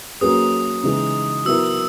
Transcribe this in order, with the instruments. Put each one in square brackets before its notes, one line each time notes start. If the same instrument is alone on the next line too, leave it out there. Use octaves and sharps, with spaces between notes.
[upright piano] F#3 A#3 C#4 G#4 B4 [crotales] D#6
[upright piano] C#3 E3 G#3 D#4
[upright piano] F#3 B3 E4 A#4 [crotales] E6